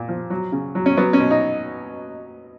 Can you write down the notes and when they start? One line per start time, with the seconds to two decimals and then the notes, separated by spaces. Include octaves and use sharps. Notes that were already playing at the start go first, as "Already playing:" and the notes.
Already playing: A#2
0.08 F3
0.30 F#3
0.52 C#3
0.75 F#3
0.86 C#4
0.97 F#3 B3
1.13 C#4
1.19 B2
1.31 D#4